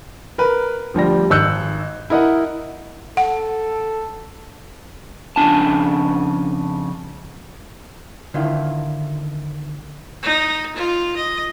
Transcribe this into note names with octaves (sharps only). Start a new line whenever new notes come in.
A#4 B4
D2 F3 G3 A#6
G#1 D#4 E6 F#6 G6 C#7
E4 A#4 D#5 F#5
A4 F#5
F2 C#3 D4 G#5 A5
D3 D#3 E4 F4
D#4
F4
D#5